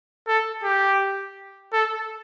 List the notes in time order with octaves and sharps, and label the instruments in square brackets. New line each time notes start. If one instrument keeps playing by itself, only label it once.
[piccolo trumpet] A4
G4
A4